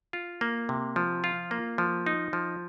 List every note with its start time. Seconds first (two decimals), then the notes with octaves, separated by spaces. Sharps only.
0.13 F4
0.41 A#3
0.69 C3
0.96 F3
1.24 F4
1.51 A#3
1.78 F3
2.06 D#4
2.33 F3